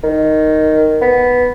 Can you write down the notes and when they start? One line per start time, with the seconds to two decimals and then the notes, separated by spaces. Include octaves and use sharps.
0.04 D#3
1.02 B3